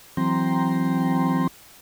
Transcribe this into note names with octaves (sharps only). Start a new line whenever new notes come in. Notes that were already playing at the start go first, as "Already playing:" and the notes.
E3 F#3 C4 G5 A#5 C6